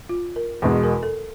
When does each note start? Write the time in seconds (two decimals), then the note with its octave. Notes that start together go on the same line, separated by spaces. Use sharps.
0.09 F4
0.36 A#4
0.62 E2 B2 G#3 B4
0.83 A#4
1.03 A4